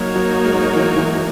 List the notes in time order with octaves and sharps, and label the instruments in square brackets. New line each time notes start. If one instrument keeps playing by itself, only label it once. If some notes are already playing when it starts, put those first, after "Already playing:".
Already playing: [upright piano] F#3 [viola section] A#3 D#4 F#4 A#4 C#5
[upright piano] F#3
G#3
E3
E3